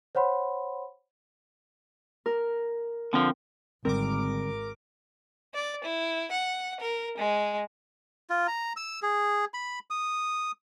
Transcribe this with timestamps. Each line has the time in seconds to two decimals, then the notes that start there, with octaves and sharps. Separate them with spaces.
0.15 C5 C#5 F#5 B5 C6
2.26 A#4
3.13 D3 F3 C4
3.85 G#1 D3 G3 C4 A#4 D6
5.54 D5
5.84 E4
6.31 F#5
6.80 A#4
7.18 G#3
8.30 F4
8.48 A#5
8.76 E6
9.03 G#4
9.54 B5
9.90 D#6